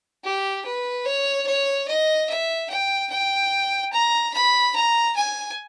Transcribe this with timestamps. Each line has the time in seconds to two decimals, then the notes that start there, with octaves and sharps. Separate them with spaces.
0.25 G4
0.66 B4
1.05 C#5
1.47 C#5
1.88 D#5
2.30 E5
2.70 G5
3.10 G5
3.93 A#5
4.34 B5
4.75 A#5
5.16 G#5